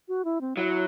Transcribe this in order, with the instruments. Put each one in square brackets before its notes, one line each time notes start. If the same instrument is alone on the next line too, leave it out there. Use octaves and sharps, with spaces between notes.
[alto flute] F#4
E4
C4
[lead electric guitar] F#3 [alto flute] E4